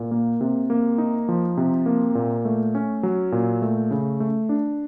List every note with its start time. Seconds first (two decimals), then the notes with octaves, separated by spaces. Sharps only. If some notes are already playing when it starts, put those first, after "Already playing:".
Already playing: A#2
0.11 A#3
0.41 C3
0.70 A#3
0.98 D#4
1.29 F3
1.57 C3
1.86 A#3
2.15 A#2
2.45 A3
2.75 C#4
3.03 F#3
3.32 A#2
3.62 A3
3.91 C#3
4.20 A3
4.49 D4